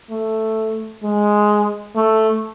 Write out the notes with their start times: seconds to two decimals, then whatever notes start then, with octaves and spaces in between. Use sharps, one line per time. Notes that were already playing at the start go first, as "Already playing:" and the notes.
0.11 A3
1.03 G#3
1.96 A3